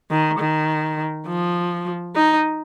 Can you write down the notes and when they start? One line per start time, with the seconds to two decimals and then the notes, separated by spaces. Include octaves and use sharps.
0.11 D#3
0.39 D#3
1.27 F3
2.15 D#4